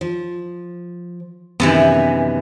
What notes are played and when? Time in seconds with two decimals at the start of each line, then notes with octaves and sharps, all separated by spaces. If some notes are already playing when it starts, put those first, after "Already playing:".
0.01 F3
1.60 F#2 C3 D#3 E3 B3